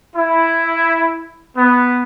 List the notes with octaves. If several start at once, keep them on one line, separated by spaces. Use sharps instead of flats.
E4
B3